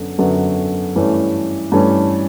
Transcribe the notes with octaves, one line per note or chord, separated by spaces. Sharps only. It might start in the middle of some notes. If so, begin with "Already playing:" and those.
Already playing: F#2 D3 F#3 B3
F#2 D3 F#3 B3
G2 E3 A3 C#4
G2 E3 A3 C#4